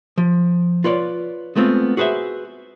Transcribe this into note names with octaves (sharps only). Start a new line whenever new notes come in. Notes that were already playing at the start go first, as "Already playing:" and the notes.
F3
F4 B4 C#5 D5
G#3 A3 B3 C4 F4
F#4 G#4 B4 C5 E5